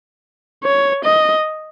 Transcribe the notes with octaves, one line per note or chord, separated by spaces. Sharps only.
C#5
D#5